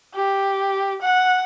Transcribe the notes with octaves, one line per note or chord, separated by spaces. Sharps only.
G4
F#5